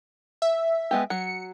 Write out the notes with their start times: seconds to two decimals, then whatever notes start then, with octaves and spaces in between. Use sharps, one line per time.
0.42 E5
0.91 G#3 B3 G4
1.10 F#3 C#7